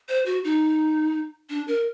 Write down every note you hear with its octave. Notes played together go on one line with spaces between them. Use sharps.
C5
F#4
D#4
D4
A#4